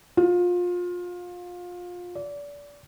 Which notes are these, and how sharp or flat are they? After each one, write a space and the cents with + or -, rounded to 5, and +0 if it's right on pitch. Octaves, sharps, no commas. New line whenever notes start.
F4 +25
D5 -30